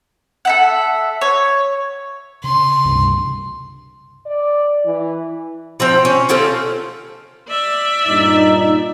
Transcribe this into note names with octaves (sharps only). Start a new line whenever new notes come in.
A4 E5 F#5
C#5
C#3 C6
C#2 G2 C3
D5
E3
F3 C4 G5
C#4
A3 C4 C#4 F4
D5 E5
G2 A#2 D#4